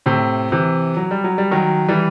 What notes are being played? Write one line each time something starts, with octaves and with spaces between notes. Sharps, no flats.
A2 C3
C3 E3
F#3
G3
F#3
G3
D#3 F#3
E3 G3